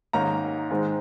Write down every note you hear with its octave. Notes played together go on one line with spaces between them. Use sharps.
G#2 D#3 A#3 C#4 A#5
G#2 D#3 G#3 C4